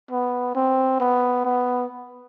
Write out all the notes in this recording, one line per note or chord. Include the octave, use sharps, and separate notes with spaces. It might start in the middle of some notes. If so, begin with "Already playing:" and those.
B3
C4
B3
B3